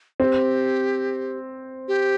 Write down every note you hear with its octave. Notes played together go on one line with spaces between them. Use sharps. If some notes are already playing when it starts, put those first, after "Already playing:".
C4 G4
G4